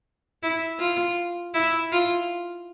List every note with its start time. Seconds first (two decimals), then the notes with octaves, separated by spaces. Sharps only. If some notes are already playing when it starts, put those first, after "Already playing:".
0.43 E4
0.79 F4
1.54 E4
1.92 F4